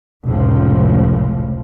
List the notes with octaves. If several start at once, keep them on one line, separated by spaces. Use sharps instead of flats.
F1 C#2 A2 F3